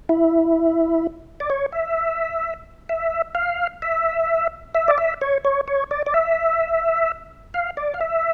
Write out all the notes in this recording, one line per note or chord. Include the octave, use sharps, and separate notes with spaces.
E4
D5
C#5
E5
E5
F5
E5
E5
D5
E5
C#5
C#5
C#5
D5
D5
E5
F5
D5
F5
E5